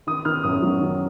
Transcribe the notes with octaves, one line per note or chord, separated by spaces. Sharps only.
D#3 D#6
D#3 F6
F#2 D#6
F#3
D#3